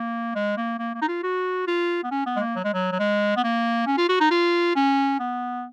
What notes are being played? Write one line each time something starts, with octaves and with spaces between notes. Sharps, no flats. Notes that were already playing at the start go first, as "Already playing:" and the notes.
Already playing: A#3
G#3
A#3
A#3
A#3
D#4
F4
F#4
F4
B3
C#4
B3
G#3
A#3
F#3
G#3
F#3
F#3
G#3
B3
A#3
C#4
F4
F#4
D#4
F4
C#4
B3